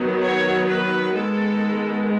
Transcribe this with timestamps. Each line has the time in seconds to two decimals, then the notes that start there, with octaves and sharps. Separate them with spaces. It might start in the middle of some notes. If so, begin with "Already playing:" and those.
Already playing: D#3 F#3 B3
0.23 C#5
0.69 B4
1.15 D#3 G#3 B3 A4